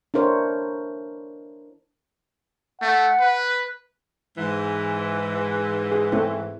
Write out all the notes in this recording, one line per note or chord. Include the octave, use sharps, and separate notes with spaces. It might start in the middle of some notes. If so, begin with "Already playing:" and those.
D4 E4 A#4 C5 C#5
A3 F#5
B4
G#2 E3
G#4
A3 C4 E4